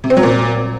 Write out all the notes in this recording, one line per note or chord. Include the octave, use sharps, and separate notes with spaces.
C3
C4
F#3
A#2